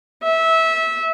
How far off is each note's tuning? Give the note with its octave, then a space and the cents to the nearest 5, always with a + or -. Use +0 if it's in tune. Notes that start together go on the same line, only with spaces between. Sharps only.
E5 -20